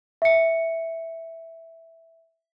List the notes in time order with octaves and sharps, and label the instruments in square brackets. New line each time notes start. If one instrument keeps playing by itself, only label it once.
[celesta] E5 C#7